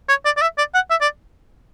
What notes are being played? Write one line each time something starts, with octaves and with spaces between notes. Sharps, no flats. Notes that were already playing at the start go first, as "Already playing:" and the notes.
C#5
D5
D5
E5
D5
F#5
E5
D5